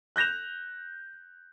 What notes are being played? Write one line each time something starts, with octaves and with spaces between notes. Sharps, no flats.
F#6 G6 A#6 E7 F7